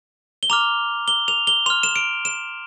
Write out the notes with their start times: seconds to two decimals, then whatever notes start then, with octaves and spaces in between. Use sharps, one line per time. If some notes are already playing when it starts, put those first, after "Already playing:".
0.43 G7
0.50 A#5 D6 F6 F7
1.08 G7
1.28 F7
1.47 G7
1.66 C6 F6 F7
1.83 E7
1.96 D7
2.25 E7